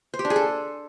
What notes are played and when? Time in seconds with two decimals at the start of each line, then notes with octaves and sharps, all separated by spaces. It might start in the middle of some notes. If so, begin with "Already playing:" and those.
0.14 C5
0.19 G4
0.25 D4
0.30 G#4
0.36 A4